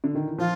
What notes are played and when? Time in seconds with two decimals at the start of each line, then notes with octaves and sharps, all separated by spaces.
0.04 D3
0.15 D#3
0.28 E3
0.38 F3 F4